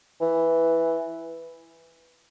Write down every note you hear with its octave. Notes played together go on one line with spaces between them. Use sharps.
E3